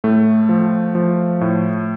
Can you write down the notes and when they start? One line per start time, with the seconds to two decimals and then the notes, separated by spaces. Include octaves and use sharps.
0.04 A2 A3
0.49 F3
0.95 F3
1.41 A2